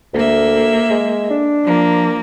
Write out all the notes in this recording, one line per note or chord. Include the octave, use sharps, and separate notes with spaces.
D2 A#3 E5
G#3
D4
F3 A#3